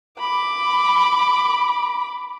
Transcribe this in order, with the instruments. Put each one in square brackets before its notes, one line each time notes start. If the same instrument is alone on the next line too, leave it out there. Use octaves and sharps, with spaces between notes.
[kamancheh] B5 D6